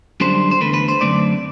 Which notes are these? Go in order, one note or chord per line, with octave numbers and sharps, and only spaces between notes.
F#2 D3 G3 D4 C5
C5
E2 D3 A3 B4
B4
C5
F#2 D3 A3 C4 D5